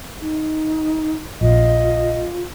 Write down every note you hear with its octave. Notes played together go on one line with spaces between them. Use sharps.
D#4
A#1 F4 D#5